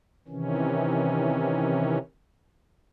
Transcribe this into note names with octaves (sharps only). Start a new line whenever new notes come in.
C3 D#3 E3 C#4